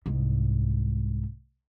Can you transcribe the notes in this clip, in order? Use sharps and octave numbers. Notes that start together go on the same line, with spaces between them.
C2 G#2